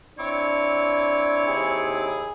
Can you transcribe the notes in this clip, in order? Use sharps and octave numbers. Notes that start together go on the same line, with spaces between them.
C4 D4 E4 C#5 D6
D#2 G#4